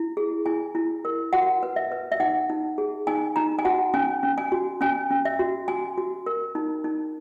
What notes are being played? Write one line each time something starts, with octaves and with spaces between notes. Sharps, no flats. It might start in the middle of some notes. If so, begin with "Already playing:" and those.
Already playing: E4
G#4
E4 G#5
E4
A#4
F#4 F#5
B4
E5
B4
E5
D#4 F#5
D#4
G#4
D#4 G#5
D#4 A#5
G#5
F#4 F#5
C#4 G#5
C#4
G#5
F#4
C#4 G#5
C#4
E5
F#4
F#4 G#5
F#4
A#4
D#4
D#4